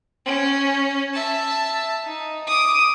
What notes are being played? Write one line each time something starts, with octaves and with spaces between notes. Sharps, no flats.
C#4
E5 A5
D#4
D6 D#6